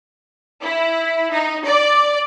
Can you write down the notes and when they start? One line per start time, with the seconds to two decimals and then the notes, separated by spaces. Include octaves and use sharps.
0.62 E4
1.31 D#4
1.64 D5